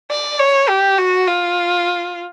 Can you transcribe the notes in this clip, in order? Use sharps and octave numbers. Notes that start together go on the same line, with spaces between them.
D5
C#5
G4
F#4
F4